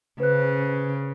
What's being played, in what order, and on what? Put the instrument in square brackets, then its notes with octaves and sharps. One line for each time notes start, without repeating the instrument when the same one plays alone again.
[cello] C#3 [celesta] B4 C5 F#6